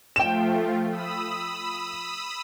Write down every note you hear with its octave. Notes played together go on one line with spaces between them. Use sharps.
F3 A3 F4 G5 E7
B5 D#6 E6